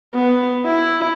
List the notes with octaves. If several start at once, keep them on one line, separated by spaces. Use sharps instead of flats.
B3
E4